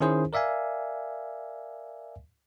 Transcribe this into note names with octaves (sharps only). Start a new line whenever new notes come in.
D#3 C#4 E4 G#4 C5
A#4 D5 E5 F5 G#5